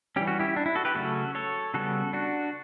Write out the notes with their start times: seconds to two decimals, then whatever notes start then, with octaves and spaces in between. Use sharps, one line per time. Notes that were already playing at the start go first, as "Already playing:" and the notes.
0.16 E3 G3 C#4 G4
0.27 F#4
0.39 E4 G4
0.56 D4
0.66 E4
0.75 F#4 A4
0.85 G4 B4
0.95 C#3 F#3 A3 C#4 F#4 A4
1.35 A4 C#5
1.74 C#3 G3 B3 F#4 A4
2.13 D4 F#4